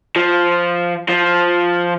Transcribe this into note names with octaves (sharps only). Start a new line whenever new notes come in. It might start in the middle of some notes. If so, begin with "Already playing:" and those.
F3
F3